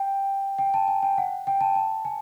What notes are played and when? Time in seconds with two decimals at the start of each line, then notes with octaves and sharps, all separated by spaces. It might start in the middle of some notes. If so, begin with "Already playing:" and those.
Already playing: G5
0.58 G5
0.74 A5
0.88 G#5
1.03 G5
1.18 F#5
1.47 G5
1.61 A5
1.75 A5
2.05 G#5